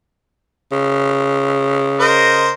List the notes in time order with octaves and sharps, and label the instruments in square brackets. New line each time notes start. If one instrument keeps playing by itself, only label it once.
[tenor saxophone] C#3
[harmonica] A#4 C5 D#5